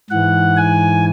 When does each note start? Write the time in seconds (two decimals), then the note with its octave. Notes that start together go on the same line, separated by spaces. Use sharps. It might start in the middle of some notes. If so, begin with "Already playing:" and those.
0.10 G#2 E3 F#5
0.57 G#5